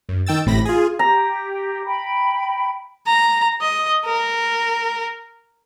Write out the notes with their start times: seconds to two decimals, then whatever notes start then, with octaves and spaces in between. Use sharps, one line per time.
0.09 F#2
0.26 D#3 G5 E6 A6
0.46 A1 A2 C3 B5 A#6
0.65 F4 G#4
0.99 G4 A#5
1.86 G5 B5
3.06 A#5
3.61 D#5
4.05 A#4